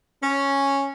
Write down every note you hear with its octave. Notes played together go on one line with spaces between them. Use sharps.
C#4